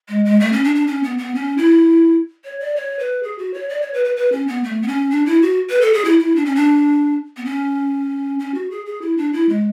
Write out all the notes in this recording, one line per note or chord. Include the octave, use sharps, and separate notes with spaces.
G#3
G#3
A3
C#4
D4
D4
C#4
B3
B3
C#4
E4
C#5
D5
C#5
B4
G#4
F#4
C#5
D5
C#5
B4
B4
B4
C#4
B3
A3
B3
C#4
D4
E4
F#4
B4
A4
G#4
E4
E4
D4
C#4
D4
B3
C#4
C#4
F#4
G#4
G#4
E4
D4
E4
G#3